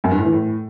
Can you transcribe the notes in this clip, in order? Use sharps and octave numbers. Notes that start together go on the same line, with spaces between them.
F#2
G2
A2
E3
A2